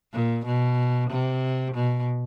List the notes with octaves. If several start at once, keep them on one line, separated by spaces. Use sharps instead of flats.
A#2
B2
C3
B2